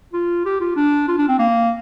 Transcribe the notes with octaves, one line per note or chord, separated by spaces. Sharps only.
F4
G4
F4
D4
F4
D4
C4
A#3